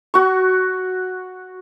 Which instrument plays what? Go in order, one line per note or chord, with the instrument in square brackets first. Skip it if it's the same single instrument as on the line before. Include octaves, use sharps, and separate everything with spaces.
[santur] F#4 C#6